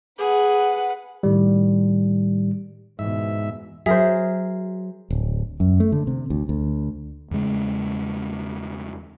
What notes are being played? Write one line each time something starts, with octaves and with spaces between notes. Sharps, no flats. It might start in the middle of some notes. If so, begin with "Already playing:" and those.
G#4 B4 F#5
A2 D#3 G3
E2 G#2 B2 E3 E5
F#3 G#4 A#4 C5 E5
D1
F#2
A3
D3
C3
D2
D2
E2 C#3 G#3